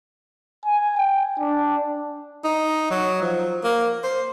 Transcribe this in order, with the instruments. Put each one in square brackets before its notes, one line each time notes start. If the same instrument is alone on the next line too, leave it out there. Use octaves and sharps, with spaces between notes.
[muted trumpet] G#5
G5
D4
[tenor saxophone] D#4
F#3
F3
A#3
C5